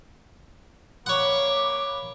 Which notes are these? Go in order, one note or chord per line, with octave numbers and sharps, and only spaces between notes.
A#3 C#5 F#5 B5 D6